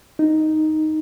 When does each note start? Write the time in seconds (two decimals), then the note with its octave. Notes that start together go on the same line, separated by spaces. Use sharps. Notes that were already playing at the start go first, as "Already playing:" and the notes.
0.19 D#4